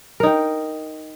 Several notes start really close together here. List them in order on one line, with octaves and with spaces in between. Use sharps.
A#4 D#4 G5